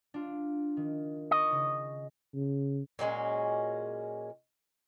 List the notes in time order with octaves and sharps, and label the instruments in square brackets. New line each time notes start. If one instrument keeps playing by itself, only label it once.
[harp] D4 F4
D#3
[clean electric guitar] D#5 [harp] C#6 D6 A#6
[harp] C#3 D#4 A#6
[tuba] C#3
[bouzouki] A#2 F#3 G#3 C#4